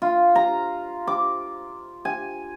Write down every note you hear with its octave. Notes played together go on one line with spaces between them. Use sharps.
F4
A#5
D6
G#5